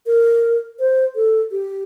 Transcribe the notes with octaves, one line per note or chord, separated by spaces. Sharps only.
A#4
C5
A4
G4